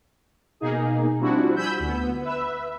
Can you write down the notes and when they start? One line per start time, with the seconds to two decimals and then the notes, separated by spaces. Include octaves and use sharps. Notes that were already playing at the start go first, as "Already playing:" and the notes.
0.60 B2 A#3 D#4 G#4
1.20 F3 G3 C4 D4 E4 F#4
1.56 G#5 B5 E6 G6
1.79 D2 B3
2.21 B4 E5